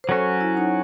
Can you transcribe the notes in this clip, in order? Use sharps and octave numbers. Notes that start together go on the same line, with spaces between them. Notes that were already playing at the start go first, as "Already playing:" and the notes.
C5
F#3 C#4 F#4 A4
E4
D#4